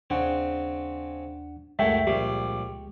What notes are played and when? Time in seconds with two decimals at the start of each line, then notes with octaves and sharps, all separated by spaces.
0.10 D#2 C#3 C4 D4 F#5
1.79 C#2 F#2 A2 G#3 A3 E5 G5
2.07 A#1 G3 G4